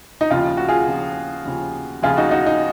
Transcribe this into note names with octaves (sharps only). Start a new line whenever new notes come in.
D#4
D#2 C#3 F3 F4
F#4
F4 G#4
D#2 C#3 F3
D#2 C#3 F3
D#2 C#3 F3 F4 G#4
D#4 F#4
D#4 F#4
D#4